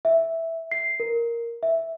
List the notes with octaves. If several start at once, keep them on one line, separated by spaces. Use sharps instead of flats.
E5
C7
A#4
E5